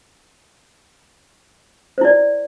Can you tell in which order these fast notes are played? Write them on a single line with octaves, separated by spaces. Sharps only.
C5 E4 D5